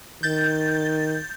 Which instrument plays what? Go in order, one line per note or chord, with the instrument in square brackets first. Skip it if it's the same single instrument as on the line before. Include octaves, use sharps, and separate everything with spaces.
[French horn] D#3 [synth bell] G6 A6